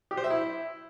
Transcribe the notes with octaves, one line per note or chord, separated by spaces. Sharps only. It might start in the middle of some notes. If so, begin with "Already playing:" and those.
G4
C5
E5
E4